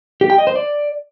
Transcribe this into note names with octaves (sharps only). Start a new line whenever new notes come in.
G4
G5
D#5
C5
D5